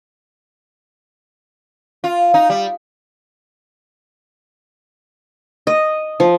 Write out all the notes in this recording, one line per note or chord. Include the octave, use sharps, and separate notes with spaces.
F4
D#4
G3
D#5
F3